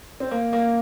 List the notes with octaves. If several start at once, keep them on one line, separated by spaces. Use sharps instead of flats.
C4
A#3
A#3